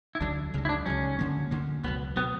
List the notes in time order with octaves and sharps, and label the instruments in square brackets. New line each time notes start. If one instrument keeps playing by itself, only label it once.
[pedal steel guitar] E4
[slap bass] D2 D3 F#3 [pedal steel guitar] D4
[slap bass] C#2 C#3 F#3
[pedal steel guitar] E4
D4
[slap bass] C#2 C#3 F#3 [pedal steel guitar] C#4
[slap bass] D2 D3 A#3
D2 D3 A#3
[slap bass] C#2 B2 F#3 [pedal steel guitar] B3
[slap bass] B2 F#3 [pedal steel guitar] B3